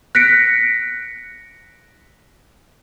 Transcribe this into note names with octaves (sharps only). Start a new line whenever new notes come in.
F#6 A#6 B6 C#7 D7